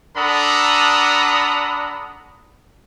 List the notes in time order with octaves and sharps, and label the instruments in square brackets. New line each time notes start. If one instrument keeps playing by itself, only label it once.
[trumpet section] D4 A4 F#5 A#5 B5 D#6